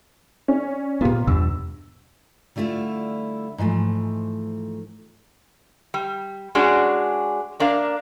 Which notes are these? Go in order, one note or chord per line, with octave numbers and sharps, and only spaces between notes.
C#4 D5
A#2 A#3 B3 F4 G4
E2 G2 B2 E6
D3 G3 A3 E4 F4
G#2 E3 F3 A3
G3
G#3 C#4 D4 F#4 G#4
A#3 D4 A#4 F5